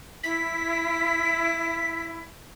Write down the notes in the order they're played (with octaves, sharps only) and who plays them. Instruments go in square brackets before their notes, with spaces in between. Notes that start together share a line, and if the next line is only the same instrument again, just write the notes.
[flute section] E4 [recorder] B6